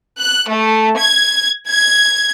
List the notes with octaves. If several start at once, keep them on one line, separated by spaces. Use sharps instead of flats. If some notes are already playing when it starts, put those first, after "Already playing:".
F#6
A3
G#6
G#6